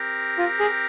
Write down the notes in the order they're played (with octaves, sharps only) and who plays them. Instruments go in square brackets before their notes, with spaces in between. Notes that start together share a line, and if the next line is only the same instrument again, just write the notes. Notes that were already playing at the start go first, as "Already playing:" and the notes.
Already playing: [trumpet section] C4 G4 A#4
[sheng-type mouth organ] F4
G#4